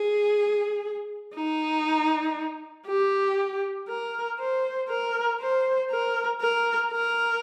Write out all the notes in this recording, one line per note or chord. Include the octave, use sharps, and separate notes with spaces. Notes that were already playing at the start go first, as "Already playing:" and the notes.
Already playing: G#4
D#4
G4
A#4
C5
A#4
C5
A#4
A#4
A#4